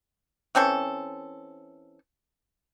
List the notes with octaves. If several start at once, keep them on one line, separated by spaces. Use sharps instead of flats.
E3 C4 C#4 A4